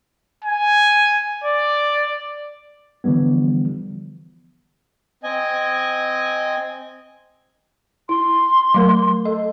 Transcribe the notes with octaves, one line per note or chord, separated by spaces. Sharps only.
G#5
D5
D3 E3 F3 G3 B3
C4 D#5 G#5
E4 C6
F#3 A3 A#4
A4 D#5